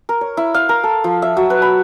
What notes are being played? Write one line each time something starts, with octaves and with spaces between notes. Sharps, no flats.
A#4
C#5
E4
F5
A#4
A4
F3
E5
F#3
B4
B5